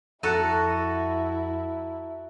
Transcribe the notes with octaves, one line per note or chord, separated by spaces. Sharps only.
F2 E4 F#4 A4 A5 A#5 F#6 D#7